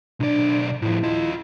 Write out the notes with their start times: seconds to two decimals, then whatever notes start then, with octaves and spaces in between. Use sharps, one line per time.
0.20 B1 D4 D5
0.82 A2 F3 E4
1.04 F4 D#5